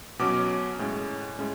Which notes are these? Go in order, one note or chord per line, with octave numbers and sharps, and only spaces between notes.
B2 F#3 C#4 D6
A2 G#3 C#4
A2 G#3 C#4